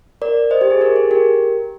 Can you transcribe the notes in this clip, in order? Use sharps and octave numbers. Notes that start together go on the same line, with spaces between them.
A#4 D5
C5 D#5
G4
G#4
G4 A#4
G#4
G4 A#4